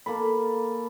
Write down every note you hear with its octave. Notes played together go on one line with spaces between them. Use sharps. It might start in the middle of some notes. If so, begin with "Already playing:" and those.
A#3 A4 B5